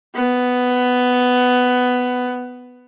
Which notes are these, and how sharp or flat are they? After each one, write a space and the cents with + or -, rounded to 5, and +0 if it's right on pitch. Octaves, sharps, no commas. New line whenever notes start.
B3 +10